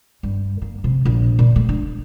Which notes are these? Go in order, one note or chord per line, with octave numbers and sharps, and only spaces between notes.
G2
A#3
C3
A#1
A#2
A3
D4